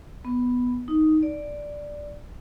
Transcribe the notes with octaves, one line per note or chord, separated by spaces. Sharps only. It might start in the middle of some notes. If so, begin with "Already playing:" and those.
B3
D#4
D5